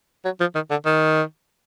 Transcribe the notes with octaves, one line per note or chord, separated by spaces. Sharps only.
F#3
F3
D#3
D3
D#3